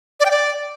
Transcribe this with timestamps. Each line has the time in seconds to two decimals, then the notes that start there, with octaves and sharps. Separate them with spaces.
0.20 D5
0.25 G5
0.31 D5